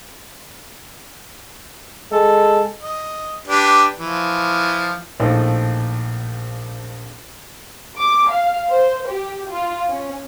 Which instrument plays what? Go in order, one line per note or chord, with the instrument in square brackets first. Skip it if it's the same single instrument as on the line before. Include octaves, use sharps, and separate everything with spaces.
[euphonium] G#3 [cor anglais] A4
[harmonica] D#5
D4 G4 B4
E3 F3
[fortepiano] A#1 A2 F3 A3 D#4 C5
[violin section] D6
F5
C5
G4
F4
C#4